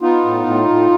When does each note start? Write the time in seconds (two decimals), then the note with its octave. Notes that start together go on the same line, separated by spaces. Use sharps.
0.01 B3 D#4 F4
0.25 A2
0.46 A2
0.69 A2